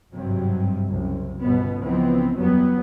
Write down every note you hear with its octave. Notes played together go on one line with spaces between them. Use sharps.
G#1 G2 C3 F#3
F#1 C2 C3
G1 C#2 B2 B3
C#2 E3 F3 B3 C4
F#1 E2 F#3 G3 B3